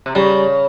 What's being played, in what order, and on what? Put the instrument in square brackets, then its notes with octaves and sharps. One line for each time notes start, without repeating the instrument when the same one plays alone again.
[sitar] C3
[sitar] C#3 [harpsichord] G3